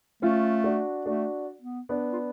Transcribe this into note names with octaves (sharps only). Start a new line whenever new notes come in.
A3 C#4 F4
D4 F#4
A3 D4 F#4
B3
B3 D4
F4